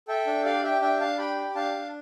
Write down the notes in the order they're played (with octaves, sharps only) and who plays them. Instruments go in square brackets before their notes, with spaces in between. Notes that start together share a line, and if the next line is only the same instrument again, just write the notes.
[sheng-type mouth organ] A4 E5 G5
D4
G4 D5 F5
G4 E5 G5
D4 E5 G5
D4 F5 A5
G4 G5 B5
G4
D4 F5 A5
D4